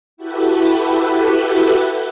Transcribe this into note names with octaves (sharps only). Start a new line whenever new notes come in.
E4 F#4 G4 A4 B4